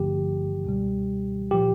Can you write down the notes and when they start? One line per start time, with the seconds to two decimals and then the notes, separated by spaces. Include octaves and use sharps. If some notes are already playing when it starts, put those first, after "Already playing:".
Already playing: G#1 G2 D3 F3 A3 G4
0.65 C#2 B2 G3
1.51 A#2 F3 G4